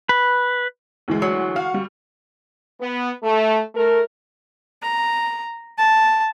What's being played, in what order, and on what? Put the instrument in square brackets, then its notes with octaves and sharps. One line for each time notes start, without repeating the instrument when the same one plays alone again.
[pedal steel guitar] B4
[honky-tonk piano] D2 E3 G#3
[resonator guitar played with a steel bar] F#3
[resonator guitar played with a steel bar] F#4 [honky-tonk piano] F5
[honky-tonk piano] G3
[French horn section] B3
A3
A3 A#4
[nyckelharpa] A#5
A5